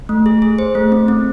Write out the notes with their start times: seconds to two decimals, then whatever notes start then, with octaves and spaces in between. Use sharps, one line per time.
0.09 A3
0.26 G#4
0.42 G#4
0.59 C5
0.75 A3
0.92 C4
1.08 C4